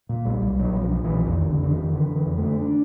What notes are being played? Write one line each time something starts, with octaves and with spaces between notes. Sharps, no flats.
A#2
B1 G3
B1
A#2 F#3
B1 F3
A#2
E3
B1
F2 D#3
F1
D3
F1 D3
D#3
F2
D3 E3
D3
E3
F2
A3
D3
D4